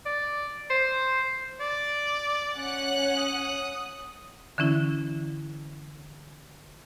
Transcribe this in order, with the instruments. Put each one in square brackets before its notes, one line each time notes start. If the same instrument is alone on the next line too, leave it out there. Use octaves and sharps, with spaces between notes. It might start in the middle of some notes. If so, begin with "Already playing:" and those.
[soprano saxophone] D5
C5
[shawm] D5
[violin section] C#4 F#5 F#6
[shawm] D#6
[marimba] D3 E3 C#4 E4